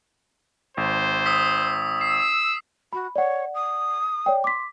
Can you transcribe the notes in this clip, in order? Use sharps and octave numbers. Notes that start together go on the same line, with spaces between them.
G#1 C5
D#6 E6 B6
E6 C7
F#4 B5
C#5 D5 F#5
D#6
C#5 D5 G5
C6 D6 B6